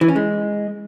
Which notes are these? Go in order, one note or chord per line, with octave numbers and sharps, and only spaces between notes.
E3
C#4
G#3